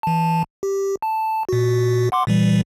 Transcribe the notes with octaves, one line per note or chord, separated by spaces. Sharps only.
E3 A5
G4
A5
A#2 F#4
F#5 C6 D6
A#2 E3 G3